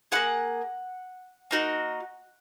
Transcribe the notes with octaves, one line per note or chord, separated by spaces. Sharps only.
A#3 F4 G#4 F#5
A#3 D#4 F#4